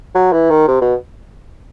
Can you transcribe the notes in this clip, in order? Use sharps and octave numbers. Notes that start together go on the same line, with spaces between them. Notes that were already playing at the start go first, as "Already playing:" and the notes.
F#3
E3
D#3
C3
B2